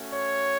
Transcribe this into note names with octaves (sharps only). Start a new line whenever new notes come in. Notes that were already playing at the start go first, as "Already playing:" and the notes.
Already playing: A3 C#4 F#4
C#5